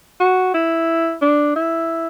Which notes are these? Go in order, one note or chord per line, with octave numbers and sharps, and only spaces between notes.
F#4
E4
D4
E4